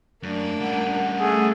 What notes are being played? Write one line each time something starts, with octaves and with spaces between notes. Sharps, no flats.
F#2 A3 A#3 D4
G3 C#4 F#5
A3 G#4